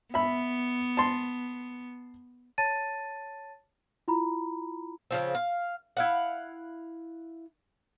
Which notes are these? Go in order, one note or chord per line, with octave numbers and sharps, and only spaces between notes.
B3 E5 B5
A5 C6
C#5 A5 A6 D#7
E4 F4 A#5 B5
C#3 F3 C4
F5
E4 F5 F#5